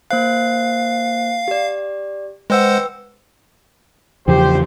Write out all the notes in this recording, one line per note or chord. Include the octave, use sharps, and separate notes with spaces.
A#3 C5 F5 F#6
G4 D5
G#3 B4 C5 F#5 G5 E6
E2 C#3 F3 G4 C5